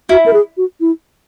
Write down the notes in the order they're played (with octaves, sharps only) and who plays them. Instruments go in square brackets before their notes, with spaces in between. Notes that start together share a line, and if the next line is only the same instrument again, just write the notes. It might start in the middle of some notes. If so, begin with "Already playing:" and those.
[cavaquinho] E4 [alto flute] F#4
[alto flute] A#4
G#4
F#4
E4